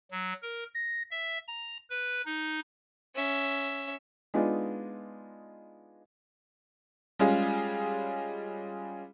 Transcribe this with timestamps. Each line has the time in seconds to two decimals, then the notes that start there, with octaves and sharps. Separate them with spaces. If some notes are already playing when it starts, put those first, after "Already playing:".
0.11 F#3
0.42 A#4
0.74 A#6
1.11 E5
1.48 A#5
1.90 B4
2.26 D#4
3.15 C#4 E5
4.34 G#3 B3 D4 D#4 F4
7.19 G3 G#3 C#4 F4 G#4